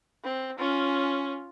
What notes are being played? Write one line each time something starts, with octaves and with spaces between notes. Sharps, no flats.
C4
C#4 F4